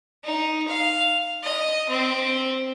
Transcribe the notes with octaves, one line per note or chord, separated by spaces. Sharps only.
D#4
F5
D#5
C4